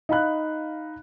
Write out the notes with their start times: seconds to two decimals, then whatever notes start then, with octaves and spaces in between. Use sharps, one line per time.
0.09 D#4 F5 B5 F#6